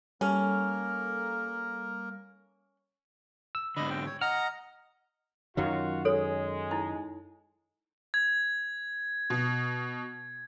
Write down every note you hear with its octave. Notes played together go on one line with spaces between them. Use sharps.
G3 A#3 C#4 A4 A#4 F6
E6
G#2 D3 D#5 B5
G5
C#5
D#5 F#5 A#5 F6
F#2 D#3 F#3 F4 F#4
G#3 A4 C#5
D#4 E4
G#6
B2